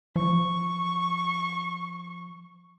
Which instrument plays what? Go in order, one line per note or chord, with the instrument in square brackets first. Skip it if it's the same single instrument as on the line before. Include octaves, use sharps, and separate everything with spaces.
[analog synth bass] F3 [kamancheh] C#6